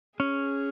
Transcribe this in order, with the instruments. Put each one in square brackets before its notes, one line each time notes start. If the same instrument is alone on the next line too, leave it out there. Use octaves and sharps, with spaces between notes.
[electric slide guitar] C#4 [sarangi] G#4